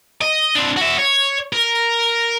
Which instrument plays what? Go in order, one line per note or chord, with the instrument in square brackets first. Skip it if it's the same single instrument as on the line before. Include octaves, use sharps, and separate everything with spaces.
[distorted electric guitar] D#5
C4 D4
F#4 E5
C#5
A#4